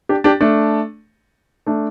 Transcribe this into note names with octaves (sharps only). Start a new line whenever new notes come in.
D4 G4
D4 G4
A3 D4
A3 D4